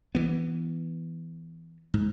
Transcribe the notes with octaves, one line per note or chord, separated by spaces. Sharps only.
E3 B3
G#2